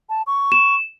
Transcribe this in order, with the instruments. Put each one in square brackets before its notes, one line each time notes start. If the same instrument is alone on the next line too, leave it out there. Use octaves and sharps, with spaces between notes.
[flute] A5
C#6
[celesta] E7